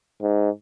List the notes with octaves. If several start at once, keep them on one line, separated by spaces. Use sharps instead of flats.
G#2